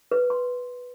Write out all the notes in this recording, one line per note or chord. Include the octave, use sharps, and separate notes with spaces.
B4
C6